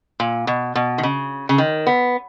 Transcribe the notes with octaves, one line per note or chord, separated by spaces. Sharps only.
A#2
B2
B2
D#3
C#3
C#3
D#3
B3